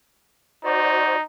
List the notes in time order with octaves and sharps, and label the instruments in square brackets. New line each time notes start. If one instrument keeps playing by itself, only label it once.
[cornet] D#4 [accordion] F#4 C5 D5